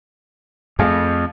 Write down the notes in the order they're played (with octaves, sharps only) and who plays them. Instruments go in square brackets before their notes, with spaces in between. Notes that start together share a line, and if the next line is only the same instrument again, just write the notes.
[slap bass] F2 [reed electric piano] A3 G#4 F5